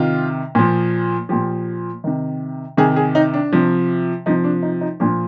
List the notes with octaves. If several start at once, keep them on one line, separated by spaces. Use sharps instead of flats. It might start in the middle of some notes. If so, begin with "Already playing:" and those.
Already playing: C3 D#3 F4
A#2 F3
A#2 F3 G4
C3 D#3
C3 D#3 G#4
G#4
D#4
D4
C3 F3
C3 F3 D#4
D4
D#4
D#4
A#2 F3 D4